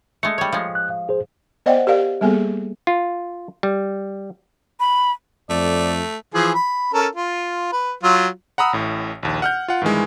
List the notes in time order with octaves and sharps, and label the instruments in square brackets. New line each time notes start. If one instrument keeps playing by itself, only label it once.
[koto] G#3 A3 [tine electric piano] C#7
[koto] G3 C#5
F3 G#3
[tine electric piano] F#6
F5
G#4 C5
[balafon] B3 C5 D5 D#5 F#5 G5
G4 A#4 D5 F5
G3 A#3 B3 G#4 A4
[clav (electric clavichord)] F4
G3
[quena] B5
[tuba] F2 [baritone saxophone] A3 [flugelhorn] D5
[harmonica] E3 F3 G#4
B5
C#4 A4 A#4
F4
B4
F#3 F4
[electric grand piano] F#5 A#5 B5 D#6 E6
A1 A2
A#1 D#2
F#5 F6 G6
F4 F#5
G2 D#3 E3 G#3